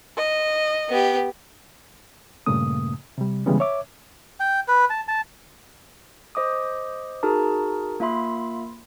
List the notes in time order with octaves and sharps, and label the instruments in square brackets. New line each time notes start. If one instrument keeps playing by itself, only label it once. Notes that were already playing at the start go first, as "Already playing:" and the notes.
[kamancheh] D#5
[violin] B3 G4
[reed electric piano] G2 A#2 C#3 A3 A#3 D#6
C3 G3
C#3 E3 G3 G#3 B3 C#4
C#5 E5 D6
[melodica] G5
B4
A5
A5
[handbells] C5 D#5 D6 D#6
D#4 F#4 G#4 A#4 A5 A#5
A#3 F4 E5 B5 C6